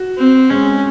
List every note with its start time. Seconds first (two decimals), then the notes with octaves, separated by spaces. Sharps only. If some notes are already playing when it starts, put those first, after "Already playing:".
Already playing: F#4
0.17 C4
0.50 G#3 C#4